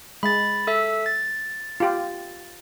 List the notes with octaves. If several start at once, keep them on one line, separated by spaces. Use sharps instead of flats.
G#3 B5 A6
A4 E5 E6
A6
F4 G4